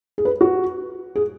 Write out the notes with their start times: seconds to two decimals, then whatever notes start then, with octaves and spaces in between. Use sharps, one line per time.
0.18 G#4
0.25 B4
0.41 F#4
1.16 G#4